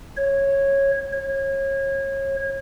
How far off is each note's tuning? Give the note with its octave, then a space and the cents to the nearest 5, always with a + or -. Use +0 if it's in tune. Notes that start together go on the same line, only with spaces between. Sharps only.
C#5 -10
C#5 -30